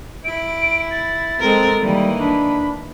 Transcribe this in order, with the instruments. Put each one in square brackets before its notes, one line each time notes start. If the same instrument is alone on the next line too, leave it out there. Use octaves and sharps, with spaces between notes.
[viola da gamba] E4 [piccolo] D7
[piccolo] A6
[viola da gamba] G#3 A4 A#4 [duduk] C4
[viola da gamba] D#3 E3 A#3 [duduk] G3
[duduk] D4 [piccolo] B5